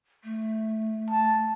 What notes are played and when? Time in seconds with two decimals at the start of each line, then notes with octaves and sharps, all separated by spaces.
0.24 A3
1.10 A5